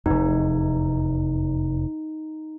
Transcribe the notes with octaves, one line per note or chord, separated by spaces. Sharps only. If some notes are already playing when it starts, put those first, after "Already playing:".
F1 E2 D#4